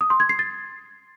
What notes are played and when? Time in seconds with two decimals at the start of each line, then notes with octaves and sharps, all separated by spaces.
0.01 D#6
0.10 C6
0.20 G#6
0.29 C7
0.39 A6